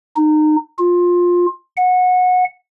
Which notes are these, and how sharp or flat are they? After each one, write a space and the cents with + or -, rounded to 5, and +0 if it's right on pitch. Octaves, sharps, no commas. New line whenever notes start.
D#4 -25
F4 +15
F#5 -20